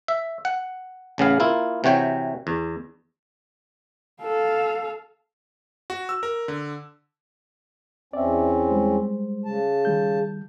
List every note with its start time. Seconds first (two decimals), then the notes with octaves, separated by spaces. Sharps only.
0.08 E5
0.45 F#5
1.18 A1 C#3 B3 F5
1.40 A#3 E4 F4
1.84 C3 E3 F#4 C#5 G5
2.47 E2
4.22 A4 F5
5.90 F#4
6.09 E6
6.23 A#4
6.48 D3
8.13 E2 C4 C#4 D5 E5
8.69 G3 G#3 C5
9.45 C#3 A5
9.85 D#3 G3 G6